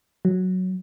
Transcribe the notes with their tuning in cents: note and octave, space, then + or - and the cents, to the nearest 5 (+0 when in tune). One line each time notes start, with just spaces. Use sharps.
F#3 +0